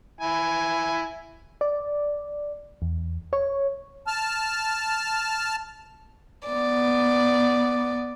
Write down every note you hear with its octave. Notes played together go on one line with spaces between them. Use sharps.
E4 G#5
D5
E2
C#5
A5 F6
B3 D5